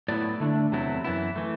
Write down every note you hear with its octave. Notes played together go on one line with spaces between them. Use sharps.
A2 F#3 B3 E4 D5
D3 A3 D4
E2 C3 F#3 A3 E4
F#2 E3 B3 E4
E3 A3